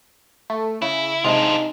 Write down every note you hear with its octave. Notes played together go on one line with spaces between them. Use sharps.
A3
C#3 E4
C3 G#3 D4 D#4 F4